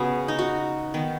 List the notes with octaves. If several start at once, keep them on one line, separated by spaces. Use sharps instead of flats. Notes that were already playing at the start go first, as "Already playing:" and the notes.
Already playing: C#3 B3 F#4 G#4 B4
D#4
F#4
D#3 B3